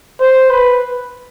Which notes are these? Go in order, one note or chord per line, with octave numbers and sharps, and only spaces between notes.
C5
B4